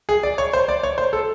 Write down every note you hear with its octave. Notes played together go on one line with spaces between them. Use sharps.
G#4
D5
C#5
C5
D5
C#5
C5
A4